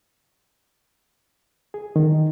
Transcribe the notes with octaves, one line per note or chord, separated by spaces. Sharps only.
G#4
D#3